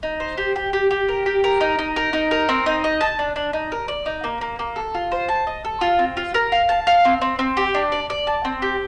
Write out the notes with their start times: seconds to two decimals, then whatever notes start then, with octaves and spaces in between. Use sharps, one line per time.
0.03 D#4
0.20 C5
0.38 G4
0.56 G4
0.73 G4
0.91 G4
1.08 A#4
1.26 G4
1.44 A#4
1.61 D#4
1.79 D#4
1.96 A#4
2.13 D#4
2.31 A#4
2.49 C4
2.66 D#4
2.84 D#5
3.01 A5
3.19 D4
3.36 D4
3.53 D#4
3.72 A#4
3.88 D5
4.06 D#4
4.24 A#3
4.41 A#3
4.59 A#3
4.76 A4
4.95 F4
5.12 C5
5.28 A5
5.47 D#5
5.65 A4
5.81 F4
5.99 C4
6.17 F4
6.34 A#4
6.52 F5
6.69 A5
6.87 F5
7.05 C4
7.21 C4
7.39 C4
7.57 G4
7.74 D4
7.92 D5
8.10 D5
8.27 A5
8.45 C4
8.62 G4